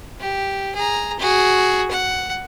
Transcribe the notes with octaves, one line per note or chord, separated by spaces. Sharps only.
G4
G#4 A#5
F#4 G#4
F#5